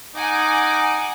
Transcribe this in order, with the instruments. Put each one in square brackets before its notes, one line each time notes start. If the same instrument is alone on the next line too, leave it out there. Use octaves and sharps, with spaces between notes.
[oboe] D#4 [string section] F#5 G#5 D6